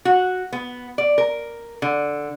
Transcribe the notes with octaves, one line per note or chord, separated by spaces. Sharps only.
F#4
B3
D5
A#4
D3